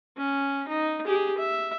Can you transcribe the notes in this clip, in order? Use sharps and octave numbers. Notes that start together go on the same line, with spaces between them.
C#4
D#4
G4 G#4
E5